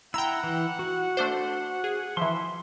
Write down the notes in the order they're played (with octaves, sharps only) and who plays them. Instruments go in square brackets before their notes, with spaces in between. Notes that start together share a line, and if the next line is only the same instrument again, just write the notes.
[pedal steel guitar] E4 A#5 [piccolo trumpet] F#5 [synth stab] G5 E6
[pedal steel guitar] E3
F#4
[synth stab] A3 D4 C5
G#4
[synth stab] E3 F3 [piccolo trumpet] E5 [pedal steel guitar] C6